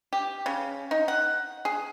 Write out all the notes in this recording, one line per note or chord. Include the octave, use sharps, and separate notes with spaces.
G4
C#3
D#4
F#5
G#4